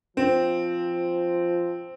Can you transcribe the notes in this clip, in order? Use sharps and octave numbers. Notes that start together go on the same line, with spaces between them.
F3 C4